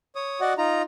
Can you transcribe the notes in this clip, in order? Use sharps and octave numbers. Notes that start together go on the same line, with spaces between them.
C#5 D#6
F#4 D5 D#5 F#5
D#4 F4 A#5